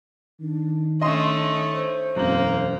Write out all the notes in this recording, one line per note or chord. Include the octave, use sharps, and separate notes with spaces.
D#3 D4
A3 C#4 D4 D#5 C6 D#6
C5
E1 F#2 A#3 C4 F#7